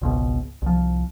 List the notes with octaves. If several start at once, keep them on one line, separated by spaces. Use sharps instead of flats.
G#1 C#2 B2
C2 F3